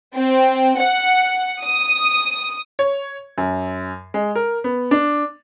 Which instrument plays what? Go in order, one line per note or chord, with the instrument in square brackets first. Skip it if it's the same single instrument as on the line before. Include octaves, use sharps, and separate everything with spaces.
[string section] C4
F#5
D#6
[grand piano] C#5
F#2
G#3
A#4
B3
D4